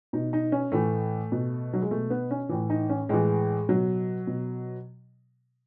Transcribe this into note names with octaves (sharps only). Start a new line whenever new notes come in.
B2 D#4
D#4
C#4
A2 E3 A3
B2
F#3
G#3
B2 A3
B3
C#4
A2 E3
D#4
C#4
A2 E3 G#3
B2 F#3
B2